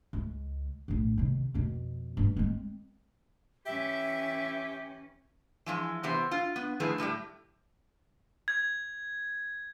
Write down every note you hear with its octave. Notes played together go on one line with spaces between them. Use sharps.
C#2
A#1 A2
C3 D#3
F2 B2
G2 D4
G#3 C4
E3 C#4 G4 E5
E3 F3 G#3
C3 E3 B3 G4 C5
F4
B3
D#3 F3 A3 E4 G#4 B4
A2 G3 A3 G4
G#6